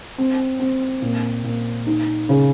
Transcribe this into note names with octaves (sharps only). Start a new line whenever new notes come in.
C4
C4
A#2
A#2
D#4
C#3